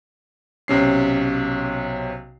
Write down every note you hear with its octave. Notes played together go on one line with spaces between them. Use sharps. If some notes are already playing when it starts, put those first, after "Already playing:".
B1 C3 C#4 C7